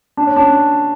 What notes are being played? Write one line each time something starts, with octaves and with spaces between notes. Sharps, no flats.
D4
C#4
D4